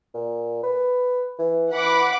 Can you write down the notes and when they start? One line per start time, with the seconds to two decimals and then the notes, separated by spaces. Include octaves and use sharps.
0.14 A#2
0.63 B4
1.39 E3
1.72 E3 F#5 B5 D6